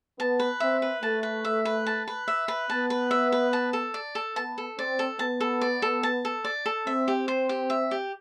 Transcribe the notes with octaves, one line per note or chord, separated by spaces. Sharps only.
B3 A5
B4
C4 E5
B4
A3 A5
B4
E5
B4
A5
B4
E5
B4
B3 A5
B4
E5
B4
A5
A4
D5
A4
B3 A5
A4
C4 D5
A4
B3 A5
A4
D5
A4
A5
A4
D5
A4
C4 E5
G4
C5
G4
E5
G4